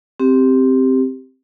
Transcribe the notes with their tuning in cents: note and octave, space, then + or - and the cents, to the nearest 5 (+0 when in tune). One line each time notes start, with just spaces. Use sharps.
C4 +0 G4 +0